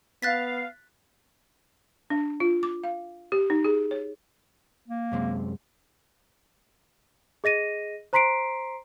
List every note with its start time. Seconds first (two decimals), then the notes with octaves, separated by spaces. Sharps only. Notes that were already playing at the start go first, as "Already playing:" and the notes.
0.22 B3 F5 F#6 A6 B6
2.10 D4
2.40 F4
2.63 D6
2.84 F5
3.32 G4
3.50 D#4
3.65 G#4
3.91 C#5
4.88 A#3
5.12 F#2 C3 G#3
7.44 G#4 D#5 A#6 D#7
8.13 C5 A#5 C6 B6 C7 D7